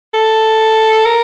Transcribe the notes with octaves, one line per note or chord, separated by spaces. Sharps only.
A4
A#4